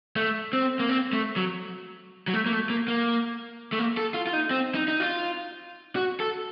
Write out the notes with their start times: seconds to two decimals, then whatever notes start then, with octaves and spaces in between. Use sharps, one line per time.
0.16 A3
0.53 C4
0.80 A#3
0.89 C4
1.13 A3
1.36 F#3
2.28 F#3
2.33 A3
2.46 A#3
2.52 A3
2.70 A#3
2.88 A#3
3.72 A3
3.79 A#3
3.97 A4
4.14 F4
4.27 F4
4.33 D#4
4.50 C4
4.75 D#4
4.88 D#4
5.00 F4
5.96 F#4
6.20 A4